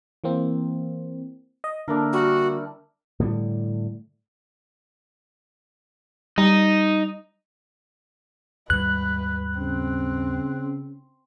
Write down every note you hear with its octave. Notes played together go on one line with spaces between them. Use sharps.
E3 A#3 C4
D#5
D3 A#3 D4 E4 A#4
G3 F#4
A2 D3 G3
G3 D#4
D#2 G#2 G3 B4 F#6
C#3 C4